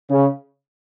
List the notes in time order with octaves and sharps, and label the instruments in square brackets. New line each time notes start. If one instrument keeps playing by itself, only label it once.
[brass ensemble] C#3